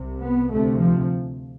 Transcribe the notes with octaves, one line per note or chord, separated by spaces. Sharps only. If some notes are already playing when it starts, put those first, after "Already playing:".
Already playing: C2 C3
B3
D2 C3 A3
F3